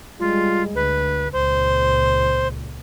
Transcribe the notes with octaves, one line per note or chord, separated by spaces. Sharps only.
G3 G#3 F4
D2 B4
C#2 A#2 C5